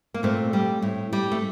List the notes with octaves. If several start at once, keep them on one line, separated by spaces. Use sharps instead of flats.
A#3
A#2 A3 C4
G3
A2
G3
A3